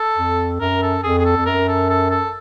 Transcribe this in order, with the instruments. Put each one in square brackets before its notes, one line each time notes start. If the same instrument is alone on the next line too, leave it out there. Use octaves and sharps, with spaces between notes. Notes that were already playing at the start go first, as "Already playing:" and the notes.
Already playing: [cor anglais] A4
[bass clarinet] F2
[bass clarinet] F#2 [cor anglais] A#4
[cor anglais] A4
[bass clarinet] F2 [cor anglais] G#4
[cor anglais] G#4
A4
[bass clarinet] F2
[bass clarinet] F#2 [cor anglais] A#4
[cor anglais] A4
A4
A4